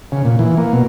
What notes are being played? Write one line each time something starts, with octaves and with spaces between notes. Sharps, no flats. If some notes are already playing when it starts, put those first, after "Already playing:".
C#3
A#2
E3
A#3
B2